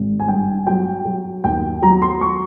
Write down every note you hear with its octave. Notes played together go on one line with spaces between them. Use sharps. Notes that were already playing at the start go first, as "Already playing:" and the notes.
Already playing: G#1
G#5
G2 G5
F#3 G5
F#3
D#2 G5
F#3 A#5
C6
C#6